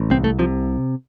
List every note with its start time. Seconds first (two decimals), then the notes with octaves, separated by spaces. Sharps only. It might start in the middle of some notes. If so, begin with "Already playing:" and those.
Already playing: A1
0.10 C2 C4
0.24 A3
0.39 C3 F3